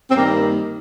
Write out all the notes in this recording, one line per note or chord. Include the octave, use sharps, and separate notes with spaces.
C4
G2 D#3 G3 A#3